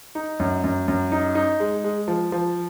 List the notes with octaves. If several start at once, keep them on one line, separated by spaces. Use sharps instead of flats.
D#4
F#2
F#2
F#2
D#4
D#4
G#3
G#3
F3
F3